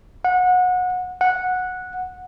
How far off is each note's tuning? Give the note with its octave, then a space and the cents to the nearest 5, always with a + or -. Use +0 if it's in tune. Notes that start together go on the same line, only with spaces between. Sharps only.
F#5 -25
F#5 -10